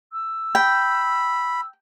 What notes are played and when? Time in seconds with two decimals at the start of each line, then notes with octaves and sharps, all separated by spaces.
0.13 E6
0.55 G5 B5